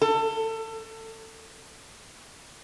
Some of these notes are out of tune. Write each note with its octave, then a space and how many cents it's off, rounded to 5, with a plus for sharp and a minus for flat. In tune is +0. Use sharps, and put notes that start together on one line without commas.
A4 +25